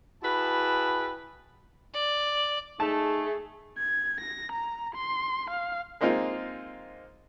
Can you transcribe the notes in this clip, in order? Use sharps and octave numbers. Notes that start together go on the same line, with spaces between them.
E4 F#4 G#4 B4 G5 A5
D5
A3 D#4 G#4 A5
G#6
A#6
A#5
C6
F5
G#3 A#3 C4 D#4 F4